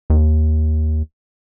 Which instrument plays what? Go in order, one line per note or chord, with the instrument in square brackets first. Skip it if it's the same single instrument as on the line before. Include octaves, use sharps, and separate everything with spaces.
[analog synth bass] D#2